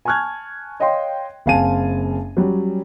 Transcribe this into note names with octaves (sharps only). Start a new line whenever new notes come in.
G#5 A5 C#6 F6 F#6 G#6
C#5 D#5 F5 G5 C6
F#1 C4 F5 G#5 A5 D#7
F#3 G3 C#4